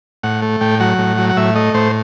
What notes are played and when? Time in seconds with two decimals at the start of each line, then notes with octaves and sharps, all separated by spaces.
0.23 A2 F#5
0.42 A3
0.61 A2 G5
0.80 F#3 F#5
0.99 A2
1.18 F#3
1.30 F#5
1.37 A2 E5
1.55 A3 D#5
1.74 A2 C5